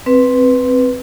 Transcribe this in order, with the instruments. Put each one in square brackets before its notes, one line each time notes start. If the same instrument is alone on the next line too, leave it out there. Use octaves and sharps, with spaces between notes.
[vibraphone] C4 B4